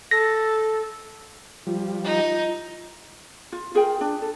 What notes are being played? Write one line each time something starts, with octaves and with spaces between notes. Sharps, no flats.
A4 A#6
F3 G3 F4
D#4
F4
F4 G#4 A#4 G5
D4
A4